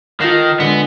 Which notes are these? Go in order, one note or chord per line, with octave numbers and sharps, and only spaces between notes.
D#3 F4 A4 F5 F#5 A#6 C7
D3 G#3 B3